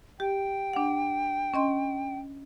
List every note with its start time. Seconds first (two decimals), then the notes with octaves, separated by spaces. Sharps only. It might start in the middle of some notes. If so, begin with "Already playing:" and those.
0.20 G4 G5
0.73 D4 F#5
1.54 C#4 D#5 C6